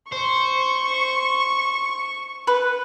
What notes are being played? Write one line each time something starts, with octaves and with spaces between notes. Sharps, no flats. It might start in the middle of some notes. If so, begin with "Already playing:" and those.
C5 C#6
B4